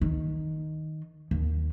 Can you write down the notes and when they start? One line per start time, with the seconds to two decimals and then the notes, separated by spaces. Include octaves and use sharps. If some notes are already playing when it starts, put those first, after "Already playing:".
0.01 D#3
1.31 D#2